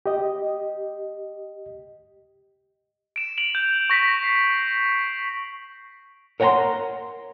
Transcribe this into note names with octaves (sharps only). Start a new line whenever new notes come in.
G4 D#5
D7 E7
D7 F7 F#7
G6
C#6 A#6 B6
C7
A#4 C#5 F#5 G5 A#5 C6